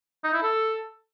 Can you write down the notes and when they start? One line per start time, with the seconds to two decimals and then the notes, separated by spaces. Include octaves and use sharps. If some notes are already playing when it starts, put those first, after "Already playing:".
0.24 D#4
0.33 E4
0.43 A4